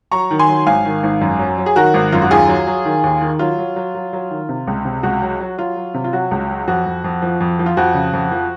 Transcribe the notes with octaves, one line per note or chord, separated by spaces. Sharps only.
F#3 A#5 C#6
D#3
G#5 C6
F#3
G#1 F5 G#5
D#3
G#1
F#2
F#3
F#3
G#4
D#3 F#4 A#4
G#1
F#2 F4
F#4
D#2 F4 G#4
F#3
F#3
D#3
D#2
D#3
F#3 F4
F#3
F#3
F#3
F#3
D#3
C3
C#2
C3
C#2 F#4
F#3
F#3
F#3 F4
F#3
C3
F4
F#3 F#4
C#2
F#3
F2 F#4
F2
F2
F3
F2
F3
F4
F2 F#4
C#3
F2
F3